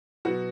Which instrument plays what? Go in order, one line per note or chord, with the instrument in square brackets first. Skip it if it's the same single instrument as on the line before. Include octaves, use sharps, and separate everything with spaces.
[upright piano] B2 F#3 B3 F#4